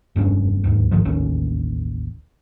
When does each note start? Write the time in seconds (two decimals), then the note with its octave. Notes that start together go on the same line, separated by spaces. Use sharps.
0.16 F1 E2 G2 C#4
0.64 D1 D#2 G#2
0.91 G#1 G#2 D#3 F3
1.05 E1 A1 D#2 C#4